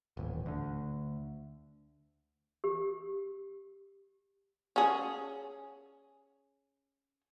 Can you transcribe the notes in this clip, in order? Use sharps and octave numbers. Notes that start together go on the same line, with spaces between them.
D#1 A1
D2 D3
G4
C#4 G#4